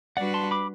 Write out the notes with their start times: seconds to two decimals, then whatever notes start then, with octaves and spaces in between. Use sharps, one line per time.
0.17 G3 D4 F#4 B4 D5 F#5
0.34 A5 C6
0.51 B5 D6